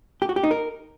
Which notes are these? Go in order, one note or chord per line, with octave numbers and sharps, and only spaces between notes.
G4
F#4
G4
D#4
A#4